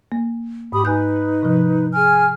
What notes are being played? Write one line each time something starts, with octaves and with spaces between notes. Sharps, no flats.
A#3
G#2 G4 B5 D#6
D#4 B4 G#5 F#6 G6
C3 F3
G#4 G#5 F6